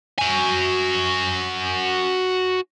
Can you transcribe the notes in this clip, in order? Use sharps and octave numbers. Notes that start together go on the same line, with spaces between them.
F#4 G#5